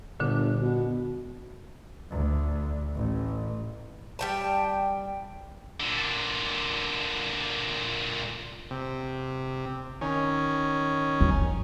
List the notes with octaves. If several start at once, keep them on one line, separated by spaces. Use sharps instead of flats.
G1 A#2 D3 D4
B2
D2
A1
G3 G5 A5
A#2 D3
C3
D#3 C#4
F2